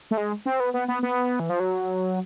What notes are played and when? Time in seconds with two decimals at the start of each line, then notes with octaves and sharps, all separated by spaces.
0.11 A3
0.17 G#3
0.46 C4
0.60 B3
0.74 B3
0.88 B3
1.03 B3
1.40 E3
1.49 F3
1.60 F#3